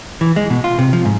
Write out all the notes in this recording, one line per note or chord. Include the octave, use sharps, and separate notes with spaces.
E3
G#3
B2
F4
C3
F3
G#2